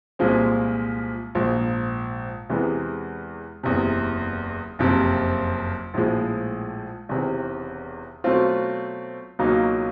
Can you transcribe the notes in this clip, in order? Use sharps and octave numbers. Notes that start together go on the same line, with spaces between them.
C2 A#2 F3 G#3 C4
A#1 G#2 F3
E2 C3 E3 G#3 B3
F#1 E2 C3
F#1 F2 C3
A#1 A2 F3 G#3
E1 E2 C3 D#3
B2 F#3 A3 C4 F4
C#2 B2 F#3 A#3 D#4